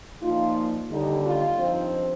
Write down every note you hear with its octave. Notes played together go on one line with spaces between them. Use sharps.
A#2 F3 A#3 D#4 F4
D#2 D3 G3 D#4
F4
G2 F3 C4 D#4